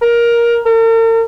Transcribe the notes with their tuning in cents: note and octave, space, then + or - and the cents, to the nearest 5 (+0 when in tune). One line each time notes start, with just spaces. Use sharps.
A#4 +15
A#4 -45